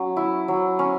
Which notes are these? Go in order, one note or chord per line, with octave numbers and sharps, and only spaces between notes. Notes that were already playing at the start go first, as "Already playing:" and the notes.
Already playing: F#3 C#4
E4
F#3
C#4